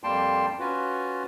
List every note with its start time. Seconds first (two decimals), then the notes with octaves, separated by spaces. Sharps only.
0.03 F2 G3 A#3 G5 A5 C6
0.59 C#4 F4 F#4 B4